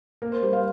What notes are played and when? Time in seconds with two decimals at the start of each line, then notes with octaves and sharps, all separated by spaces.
0.22 A#3 A#4
0.32 C5
0.42 G3 C5
0.53 C5 F5